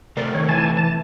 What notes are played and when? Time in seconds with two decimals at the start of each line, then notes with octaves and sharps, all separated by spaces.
0.17 C3 A3 A#4 C5 D5
0.35 D#3 C#5
0.49 E3 G#5 A5
0.77 A5